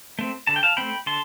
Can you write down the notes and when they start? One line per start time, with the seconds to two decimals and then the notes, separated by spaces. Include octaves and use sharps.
0.19 A3 C4
0.47 D3 A5
0.56 G5
0.63 F5 A5
0.77 A3 C4 G5 B5
1.06 D3 A5 C6